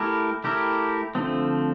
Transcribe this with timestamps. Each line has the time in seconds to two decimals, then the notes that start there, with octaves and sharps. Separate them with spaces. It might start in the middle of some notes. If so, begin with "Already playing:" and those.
Already playing: A3 E4 G4 A#4
0.44 A3 E4 G4 A#4
1.15 D3 F3 A3 C4